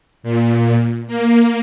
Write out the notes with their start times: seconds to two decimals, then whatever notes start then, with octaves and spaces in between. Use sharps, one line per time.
0.23 A#2
1.07 A#3